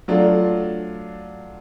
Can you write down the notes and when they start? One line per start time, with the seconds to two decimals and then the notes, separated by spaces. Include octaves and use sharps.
0.08 F#3 A3 D4 F4